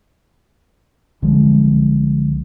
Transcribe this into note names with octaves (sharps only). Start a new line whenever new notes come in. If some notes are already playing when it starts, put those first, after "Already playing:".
C2 D3 F3 G#3